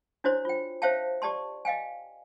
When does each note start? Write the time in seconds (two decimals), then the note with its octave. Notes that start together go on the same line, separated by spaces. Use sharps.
0.24 D4 E4 F#4 C5 C#5 C6
0.45 F4 G5
0.82 C5 C#5 E5 F5 G5 A5
1.22 G4 D5 A5 C6
1.65 D#5 F5 G5 G#5